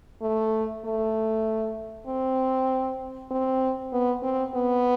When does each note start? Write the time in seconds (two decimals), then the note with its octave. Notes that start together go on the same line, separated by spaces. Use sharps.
0.22 A3
0.85 A3
2.07 C4
3.31 C4
3.93 B3
4.23 C4
4.55 B3